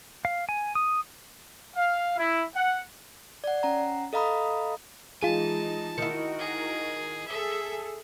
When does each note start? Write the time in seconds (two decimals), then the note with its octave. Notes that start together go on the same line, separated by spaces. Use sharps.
0.25 F5
0.49 G#5
0.75 D#6
1.76 F5
2.18 E4
2.56 F#5
3.44 D5 F#5
3.63 C#4 F#5 A#5
4.13 A4 D#5 F5 A#5 B5 D#6
5.21 E3 G#3 D#4 F4 G#4 A5 D#7
5.98 D#3 E4 F#4 A#4 C#7
6.39 G#4
7.27 G#4 A4 E5